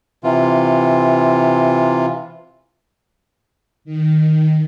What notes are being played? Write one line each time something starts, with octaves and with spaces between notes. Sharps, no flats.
C3 E3 F4
D#3